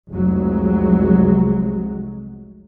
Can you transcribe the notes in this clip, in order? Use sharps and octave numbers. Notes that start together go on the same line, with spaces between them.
F1 C2 F#3 G#3